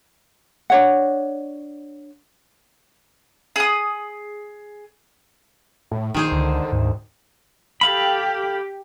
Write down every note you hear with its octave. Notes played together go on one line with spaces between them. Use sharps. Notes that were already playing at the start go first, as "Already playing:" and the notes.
D4 C#5 F#5
G#4 D#6
A2
A#1 D#3 G#4 C5
C#2 D3
D2 G#2
G4 A4 F5 B5